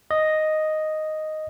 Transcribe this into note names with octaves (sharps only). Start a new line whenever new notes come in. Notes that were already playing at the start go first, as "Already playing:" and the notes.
D#5